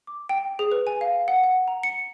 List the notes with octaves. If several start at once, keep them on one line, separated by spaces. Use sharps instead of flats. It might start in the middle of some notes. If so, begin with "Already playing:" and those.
D6
G5
G#4
B4
G#5
F5
F#5
F#5
A#5
C#7